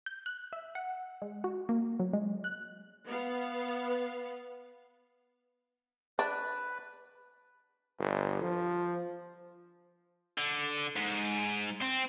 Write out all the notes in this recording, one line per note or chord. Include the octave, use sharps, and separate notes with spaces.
G6
F#6
E5
F#5
G#3
F#4
A#3
F#3
G#3
F#6
B3 F5
D4 B4
G1
F3
D3
G#2
C4